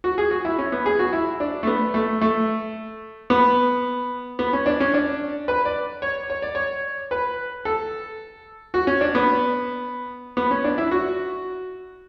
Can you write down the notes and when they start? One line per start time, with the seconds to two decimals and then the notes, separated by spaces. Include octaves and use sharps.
0.04 F#4
0.18 G#4
0.31 F#4
0.45 E4
0.58 C#4
0.72 B3
0.86 G#4
0.99 F#4
1.13 E4
1.40 D4
1.63 A3
1.67 B3
1.94 A3
2.21 A3
3.30 B3
4.39 B3
4.53 C#4
4.66 D4
4.80 C#4
4.94 D4
5.48 B4
5.65 D5
6.02 C#5
6.30 C#5
6.42 D5
6.55 C#5
7.11 B4
7.65 A4
8.74 F#4
8.87 C#4
9.01 D4
9.15 B3
10.37 B3
10.51 C#4
10.64 D4
10.78 E4
10.91 F#4